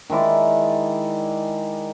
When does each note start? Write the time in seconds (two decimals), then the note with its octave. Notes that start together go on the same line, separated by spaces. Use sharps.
0.10 D#3 G#3 E4 D5